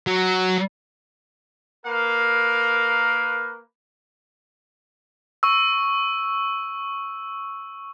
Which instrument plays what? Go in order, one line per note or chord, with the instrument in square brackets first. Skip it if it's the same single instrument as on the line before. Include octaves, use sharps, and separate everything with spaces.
[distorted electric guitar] F#3
[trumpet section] A#3 A#4 B4 F5
[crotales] C#6 E6